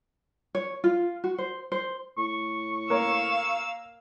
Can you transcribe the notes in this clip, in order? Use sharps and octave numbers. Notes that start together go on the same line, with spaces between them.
C#5
F4
F#4
C5
C5
A2 C#6
A#3 A#4 C#5 F5 E6